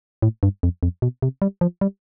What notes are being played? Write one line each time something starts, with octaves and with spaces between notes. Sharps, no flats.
A2
G2
F2
F2
B2
C3
G3
F3
G3